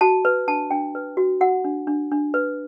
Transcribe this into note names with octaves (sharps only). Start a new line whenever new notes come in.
F#4 A5
B4
D4 A5
D4 G5
B4
F#4
F#4 F#5
D4
D4
D4
B4